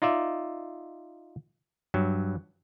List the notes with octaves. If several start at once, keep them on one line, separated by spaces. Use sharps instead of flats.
D#4 F4 D5 E5
G2 F#3